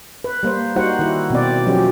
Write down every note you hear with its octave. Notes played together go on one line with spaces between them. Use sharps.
B4
G3 A#3 C5
G3 D#4 F#4 C5 F#5
D#3 E4
B2 C4 D5
F3 F#3 C#4 G4